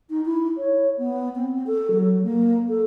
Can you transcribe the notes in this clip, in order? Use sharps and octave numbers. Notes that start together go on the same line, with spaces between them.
D#4
E4
C#5
B3
C4
C4
A4
F#3
A#3
A4